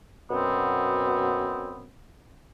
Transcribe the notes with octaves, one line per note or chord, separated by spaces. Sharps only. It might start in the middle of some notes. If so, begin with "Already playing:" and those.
F#2 B2 B3 C4